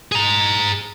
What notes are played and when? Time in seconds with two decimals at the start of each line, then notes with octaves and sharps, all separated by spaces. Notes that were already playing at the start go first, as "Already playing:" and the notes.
0.12 G#4 A#5